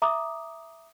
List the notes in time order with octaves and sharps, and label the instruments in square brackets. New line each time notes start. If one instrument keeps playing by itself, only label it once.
[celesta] E5 A#5 D6 D#6